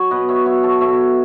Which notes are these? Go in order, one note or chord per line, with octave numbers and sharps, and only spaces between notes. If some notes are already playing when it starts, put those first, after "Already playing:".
Already playing: F#3 C#5
B2 B4 D#5
C#5 E5
F#3 C#5 E5
A4 C#5
B2 C#5 E5